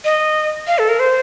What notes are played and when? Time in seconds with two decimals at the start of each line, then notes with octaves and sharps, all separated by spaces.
0.05 D#5
0.67 F5
0.78 A4
0.89 A#4
1.00 C5